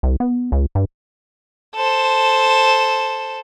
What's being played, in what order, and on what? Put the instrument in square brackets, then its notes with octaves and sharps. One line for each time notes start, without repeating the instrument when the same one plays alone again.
[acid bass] C2
B3
C#2
G2
[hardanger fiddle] A4 C5